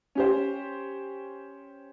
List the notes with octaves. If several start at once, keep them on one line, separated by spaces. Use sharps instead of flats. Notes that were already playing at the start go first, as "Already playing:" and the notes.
C#4 G4 C5